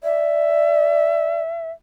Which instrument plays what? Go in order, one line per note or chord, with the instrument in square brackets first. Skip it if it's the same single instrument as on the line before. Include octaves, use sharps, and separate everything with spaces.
[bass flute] D5 [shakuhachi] E5